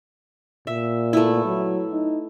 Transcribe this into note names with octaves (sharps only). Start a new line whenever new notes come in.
A#2 E5
A3 B3 E4
F#3
D#4